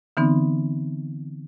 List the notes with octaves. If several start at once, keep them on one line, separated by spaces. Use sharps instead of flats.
D3 E3 B3 C4 D#4